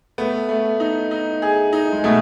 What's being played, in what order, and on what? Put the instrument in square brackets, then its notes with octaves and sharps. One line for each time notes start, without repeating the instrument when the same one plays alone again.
[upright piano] A3 [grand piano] B3
[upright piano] A3
D#4
D#4
G#4
D#4
[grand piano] G#3
[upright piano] B2 [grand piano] A3